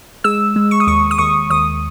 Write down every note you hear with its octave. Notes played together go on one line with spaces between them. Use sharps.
G#3 E6
G#3
C#6
D#6
D#2 C#6
D#6
D#2 C#6
D#2 D#6